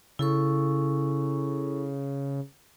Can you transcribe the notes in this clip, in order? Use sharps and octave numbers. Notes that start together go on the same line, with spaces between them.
C#3 E4 A4 C#6